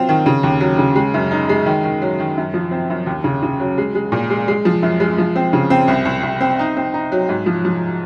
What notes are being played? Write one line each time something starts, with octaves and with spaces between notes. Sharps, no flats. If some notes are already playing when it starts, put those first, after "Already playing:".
Already playing: F#3 C4 F4
D#3
C#3
D#2
F#3
C#3
G#3
F#2
D#4
G#3
D#3
D#3
F#3
D#3
F#2
F3
C4
F#2
D#2
C#3
C#3
F#3
G#3
G#3
A#2
G#3
G#3
F3
F#2
G#3
F3
C4
C#3
C4
C2
C2
C2
C4
D#4
C4
D#4
F#3
G#2
F3
F3